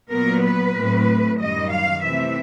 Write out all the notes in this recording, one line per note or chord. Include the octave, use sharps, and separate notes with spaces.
A#2 F#3 B3 A#4
B4
A2 F#3 A3 C4
F#2 D#3 G3 D#5
F5
C3 E3 A3 C4 E5